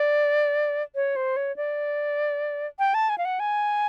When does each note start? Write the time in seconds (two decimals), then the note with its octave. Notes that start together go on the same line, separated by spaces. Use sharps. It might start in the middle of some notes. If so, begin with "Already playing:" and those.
Already playing: D5
0.95 C#5
1.16 C5
1.36 C#5
1.56 D5
2.79 G5
2.94 A5
3.09 G#5
3.18 F5
3.25 F#5
3.40 G#5